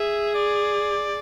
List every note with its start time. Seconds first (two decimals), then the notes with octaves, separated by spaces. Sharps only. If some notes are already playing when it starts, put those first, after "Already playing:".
Already playing: G#4 E5
0.34 D5